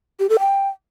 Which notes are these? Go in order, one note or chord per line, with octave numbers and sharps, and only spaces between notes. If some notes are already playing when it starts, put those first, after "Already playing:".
G4
A4
G5